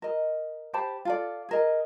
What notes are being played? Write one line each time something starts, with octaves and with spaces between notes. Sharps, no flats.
A#4 D#5
G4 C5 A5 B5
F4 A4 D5
G#4 A#4 D#5